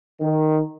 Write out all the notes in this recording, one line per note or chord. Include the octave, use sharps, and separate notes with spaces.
D#3